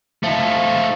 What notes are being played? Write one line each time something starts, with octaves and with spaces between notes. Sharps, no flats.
F3 A3 D#4